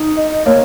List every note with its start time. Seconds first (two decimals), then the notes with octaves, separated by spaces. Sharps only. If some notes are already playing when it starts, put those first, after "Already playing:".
Already playing: D#4
0.17 D#5
0.46 A#3 C#5